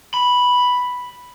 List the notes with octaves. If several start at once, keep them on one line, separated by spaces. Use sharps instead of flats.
B5